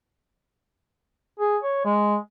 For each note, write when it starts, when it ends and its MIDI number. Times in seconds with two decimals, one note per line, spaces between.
1.39 1.57 68
1.63 1.82 73
1.85 2.17 56